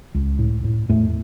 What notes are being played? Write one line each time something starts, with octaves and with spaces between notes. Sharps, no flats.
C#2
A2
A2
E2 A2 A3